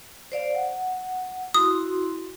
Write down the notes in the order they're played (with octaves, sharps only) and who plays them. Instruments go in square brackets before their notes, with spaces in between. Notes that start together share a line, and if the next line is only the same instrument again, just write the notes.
[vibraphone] C5 D5 F5
F#5
[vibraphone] E4 F#4 C6 [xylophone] D#6